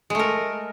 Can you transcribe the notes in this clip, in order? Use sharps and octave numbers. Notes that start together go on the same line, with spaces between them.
G#3 A3 A#4